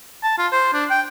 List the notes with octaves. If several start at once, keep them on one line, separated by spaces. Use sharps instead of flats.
A5
F4
C5
D4
G5